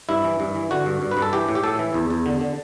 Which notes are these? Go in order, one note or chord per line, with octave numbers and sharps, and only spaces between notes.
G2 E4
E3
G2
E3
D3 F#4
G2
G2
B4
G2
A4
E3 G4
A2
G4
A2 A4
E3
E2
E2
D3
D3